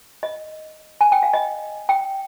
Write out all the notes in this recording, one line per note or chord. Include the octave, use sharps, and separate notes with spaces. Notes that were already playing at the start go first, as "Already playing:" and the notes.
D#5
G#5
G5
F5
D#5
G5